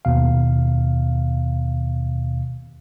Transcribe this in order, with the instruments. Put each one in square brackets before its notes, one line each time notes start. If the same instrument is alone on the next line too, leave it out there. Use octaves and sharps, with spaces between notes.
[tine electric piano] D#2 B2 F5